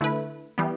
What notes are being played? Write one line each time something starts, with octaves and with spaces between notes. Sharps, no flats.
D3 A3 E4 B4
E3 G3 B3